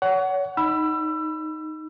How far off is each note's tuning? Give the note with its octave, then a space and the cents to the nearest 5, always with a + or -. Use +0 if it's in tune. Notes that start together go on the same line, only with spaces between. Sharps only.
C#5 +35 F#5 +15
D#4 +0 B5 +0 E6 +30